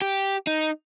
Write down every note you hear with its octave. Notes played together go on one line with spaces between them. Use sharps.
G4
D#4